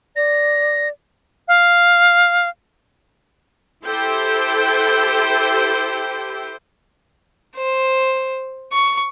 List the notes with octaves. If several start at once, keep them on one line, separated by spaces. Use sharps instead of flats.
D5 A#6
F5
E4 G4 A4 C5 G5
C5
C#6